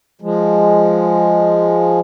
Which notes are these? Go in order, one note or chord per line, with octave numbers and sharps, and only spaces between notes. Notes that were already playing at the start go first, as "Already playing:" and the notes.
F3 G#3